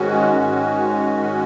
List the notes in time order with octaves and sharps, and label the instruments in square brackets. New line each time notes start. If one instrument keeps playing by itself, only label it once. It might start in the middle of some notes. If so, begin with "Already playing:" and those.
Already playing: [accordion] G#2 D#3 G#3 C#4 F#4
G#2 D#3 G#3 C#4
G#2 D#3 G#3 C#4